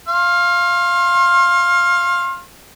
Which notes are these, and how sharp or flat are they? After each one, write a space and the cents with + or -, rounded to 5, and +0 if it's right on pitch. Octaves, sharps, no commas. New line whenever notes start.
F5 +0 C6 +35